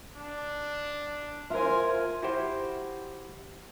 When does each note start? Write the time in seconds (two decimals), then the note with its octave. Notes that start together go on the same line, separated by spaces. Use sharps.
0.16 D4
1.50 F4 A#4 C5 E5 G#5
2.23 E4 F#4 G4 C5